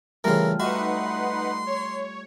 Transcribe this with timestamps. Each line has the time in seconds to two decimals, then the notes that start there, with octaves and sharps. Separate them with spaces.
0.24 C#3 E3 G3 A3 F4 A#4
0.60 D#4 F#4 B4 E5 F#5 C6
1.66 C#5